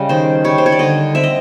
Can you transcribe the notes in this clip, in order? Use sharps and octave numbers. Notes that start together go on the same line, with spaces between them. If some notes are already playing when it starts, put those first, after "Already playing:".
Already playing: C#3 G3 D#5
D#3 C5
G3 C#5
C5
C#5
D5
D3 D#5
C4 E5
D#5